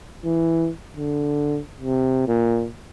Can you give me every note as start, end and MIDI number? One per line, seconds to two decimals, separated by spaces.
0.25 0.70 52
0.96 1.59 50
1.80 2.24 48
2.28 2.68 46